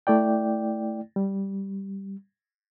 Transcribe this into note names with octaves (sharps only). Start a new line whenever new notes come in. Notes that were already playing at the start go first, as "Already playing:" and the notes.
A3 E4 D5 G5
G3